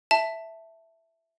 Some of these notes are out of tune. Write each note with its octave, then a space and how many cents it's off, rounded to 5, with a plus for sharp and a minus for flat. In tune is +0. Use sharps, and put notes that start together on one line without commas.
E5 +0 A5 +5